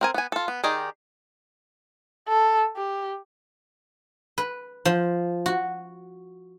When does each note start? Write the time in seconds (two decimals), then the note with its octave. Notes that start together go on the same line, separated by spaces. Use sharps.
0.01 C4 A#4 G#5
0.14 B3 G#5
0.32 F4 A4
0.48 B3
0.64 D#3 G4 G#4 D5 D#5
2.29 A4
2.76 G4
4.38 B4
4.85 F3
5.46 F#4